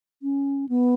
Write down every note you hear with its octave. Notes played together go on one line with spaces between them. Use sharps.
C#4
B3